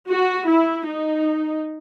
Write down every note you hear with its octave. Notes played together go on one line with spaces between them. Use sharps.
F#4
E4
D#4